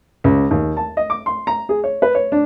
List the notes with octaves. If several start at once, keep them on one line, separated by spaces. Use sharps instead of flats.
C#2
D#2
A5
D#5
D6
C6
A#5
G#4
C#5
B4
C#5
D4